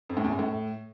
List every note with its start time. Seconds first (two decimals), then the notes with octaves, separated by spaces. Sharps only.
0.09 F2
0.17 A2
0.24 E2
0.32 F#2
0.39 A2